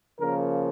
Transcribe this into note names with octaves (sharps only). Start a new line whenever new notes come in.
C#3 F3 A#3 A#4